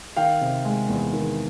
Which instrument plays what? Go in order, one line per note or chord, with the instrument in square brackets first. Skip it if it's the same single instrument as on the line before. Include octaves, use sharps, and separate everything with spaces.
[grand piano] D#3 F5 G5
C3
G#3
E2
D#3